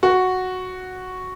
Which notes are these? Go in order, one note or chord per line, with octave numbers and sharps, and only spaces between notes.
F#4